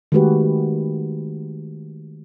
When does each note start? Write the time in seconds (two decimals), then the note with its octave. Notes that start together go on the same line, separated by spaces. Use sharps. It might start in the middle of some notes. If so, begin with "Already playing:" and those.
0.12 D#3 G#3 A3 F#4 G4 B4